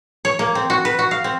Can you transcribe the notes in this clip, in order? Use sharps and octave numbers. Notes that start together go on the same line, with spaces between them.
C#5
A#3
C4
F#4
B4
F#4
F5
C4